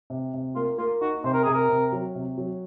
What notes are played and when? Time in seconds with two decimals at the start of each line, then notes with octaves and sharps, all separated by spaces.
0.10 C3
0.34 C3
0.55 A#3 F4
0.78 A#3 F4
1.01 D#4 F#4
1.24 C3 C5
1.33 A#4
1.44 C3 G#4
1.53 A#4
1.69 C3
1.92 F#3
2.15 C3
2.38 F#3